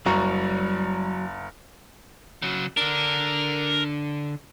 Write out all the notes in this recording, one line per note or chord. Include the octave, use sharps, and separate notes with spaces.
F#1 F#3 G3 A#5
C#3 F#3
D3 D4 A#4